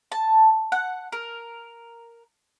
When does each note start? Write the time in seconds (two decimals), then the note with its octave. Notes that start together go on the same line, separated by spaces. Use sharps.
0.12 A5
0.72 F#5
1.12 A#4